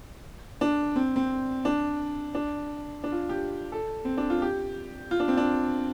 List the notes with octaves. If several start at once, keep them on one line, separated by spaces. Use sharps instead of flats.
D4
C4
C4
D4
D4
D4
F4
G4
A4
C4
D4
F4
G4
F4
D4
C4
D4